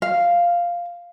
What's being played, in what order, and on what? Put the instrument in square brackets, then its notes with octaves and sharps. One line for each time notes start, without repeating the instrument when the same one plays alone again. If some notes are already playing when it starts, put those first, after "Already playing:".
[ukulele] F5